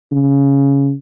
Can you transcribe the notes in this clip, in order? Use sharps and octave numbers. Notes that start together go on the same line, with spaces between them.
C#3